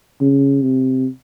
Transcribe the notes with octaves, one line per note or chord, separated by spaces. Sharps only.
C#3
C3